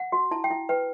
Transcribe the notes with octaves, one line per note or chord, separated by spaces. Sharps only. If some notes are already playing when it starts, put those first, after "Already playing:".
Already playing: F#5
F#4
E4 A5
G5
E4
B4 G5